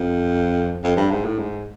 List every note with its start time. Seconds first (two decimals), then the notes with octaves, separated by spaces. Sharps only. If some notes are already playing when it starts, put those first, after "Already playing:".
Already playing: F2
0.84 F2
0.97 G2
1.11 G#2
1.25 A2
1.39 G#2